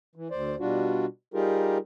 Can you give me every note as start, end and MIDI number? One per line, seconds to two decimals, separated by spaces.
0.16 0.28 52
0.31 0.55 38
0.31 0.55 72
0.31 0.55 74
0.59 1.06 47
0.59 1.06 55
0.59 1.06 62
0.59 1.06 65
0.59 1.06 66
1.34 1.78 55
1.34 1.78 63
1.34 1.78 65
1.34 1.78 67
1.34 1.78 68
1.34 1.78 70